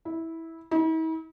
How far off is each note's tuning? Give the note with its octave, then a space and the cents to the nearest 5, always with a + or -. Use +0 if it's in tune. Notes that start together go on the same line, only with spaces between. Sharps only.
E4 -15
E4 -45